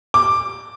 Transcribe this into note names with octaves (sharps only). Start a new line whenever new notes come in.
D6